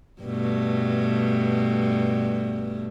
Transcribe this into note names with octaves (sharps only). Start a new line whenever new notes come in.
G2 B2 A3